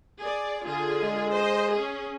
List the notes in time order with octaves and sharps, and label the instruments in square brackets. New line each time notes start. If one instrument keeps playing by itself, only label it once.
[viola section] G#4 D5
D3 F4 G#4
[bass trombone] G#3
[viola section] C5 D#5
C#4 G#4